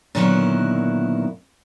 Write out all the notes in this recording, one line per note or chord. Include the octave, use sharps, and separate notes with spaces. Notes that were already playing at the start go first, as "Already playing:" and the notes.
A#2 D3 D#3 F#3 B3 E4